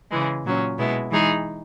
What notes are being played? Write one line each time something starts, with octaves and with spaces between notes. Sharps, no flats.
C#3 E3 G#3
A#2 F#3 C#4
B2 G#3 B3 E4
E3 G#3 D#4 G#4